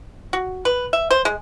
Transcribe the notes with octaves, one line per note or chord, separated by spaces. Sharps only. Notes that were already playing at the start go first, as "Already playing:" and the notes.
F#4
B4
E5
C5
G#3